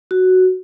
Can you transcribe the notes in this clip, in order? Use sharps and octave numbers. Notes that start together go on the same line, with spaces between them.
F#4